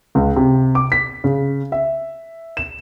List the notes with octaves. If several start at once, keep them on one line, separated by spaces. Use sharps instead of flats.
C#2
C3
D6
B6
C#3
E5
E7